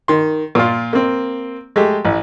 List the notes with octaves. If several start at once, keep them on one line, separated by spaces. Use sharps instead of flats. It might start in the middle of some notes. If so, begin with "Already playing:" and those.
D#3 C6
A#2 F4
A#3 C4
G#3 A3 G4
A1